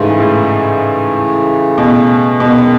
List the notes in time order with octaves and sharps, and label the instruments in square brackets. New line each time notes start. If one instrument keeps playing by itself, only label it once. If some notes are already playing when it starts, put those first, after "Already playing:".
Already playing: [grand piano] G#2 [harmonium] C#3 E3 A3
[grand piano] A2
B2
[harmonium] F#2 D#3 G#3 [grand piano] B2